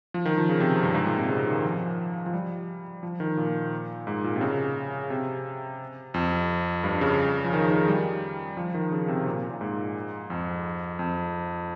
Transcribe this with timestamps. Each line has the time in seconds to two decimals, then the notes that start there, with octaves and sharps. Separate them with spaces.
0.14 F3
0.25 D#3
0.38 F3
0.49 C#3
0.60 C3
0.83 G2
0.94 G#2
1.06 A#2
1.18 C3
1.29 C#3
1.47 D#3
1.64 F3
2.26 F3
2.33 G3
3.03 F3
3.20 D#3
3.37 A#2
4.07 G#2
4.24 A#2
4.36 C3
4.41 C#3
5.10 C3
6.14 F2
6.84 G2
7.01 C#3
7.45 F3
7.53 D#3
7.70 D#3
7.88 G3
8.57 F3
8.74 D#3
8.92 C#3
9.08 C3
9.26 A#2
9.50 A#2
9.61 G#2
10.30 F2
10.99 F2